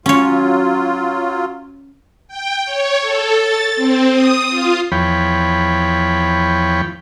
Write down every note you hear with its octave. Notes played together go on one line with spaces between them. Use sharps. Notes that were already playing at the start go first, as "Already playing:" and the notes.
F#3 C#4 F4 C#5
G5
C#5
A4
A6
C4
D#6
F4
E2 F3 C#5 G5 B5